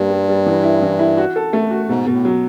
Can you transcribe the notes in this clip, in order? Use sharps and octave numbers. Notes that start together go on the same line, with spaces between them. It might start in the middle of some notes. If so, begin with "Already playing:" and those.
Already playing: G2 G3 A#3
G3
G3
E3
E4
E3
E4
F#4
A4
A3
F#4
G#2 B2
B2
A2
F#3